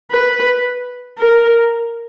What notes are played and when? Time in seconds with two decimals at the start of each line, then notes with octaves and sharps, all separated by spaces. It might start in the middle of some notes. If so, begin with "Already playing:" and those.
0.12 B4
1.18 A#4